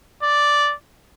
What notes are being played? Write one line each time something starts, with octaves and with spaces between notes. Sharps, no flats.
D5